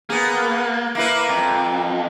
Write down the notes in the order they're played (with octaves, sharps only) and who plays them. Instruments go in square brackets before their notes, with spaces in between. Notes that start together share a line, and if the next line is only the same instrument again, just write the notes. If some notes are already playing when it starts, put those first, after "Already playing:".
[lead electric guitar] A#3 [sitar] B3 G#4
[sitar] A#3 E4 B4
[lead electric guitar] F2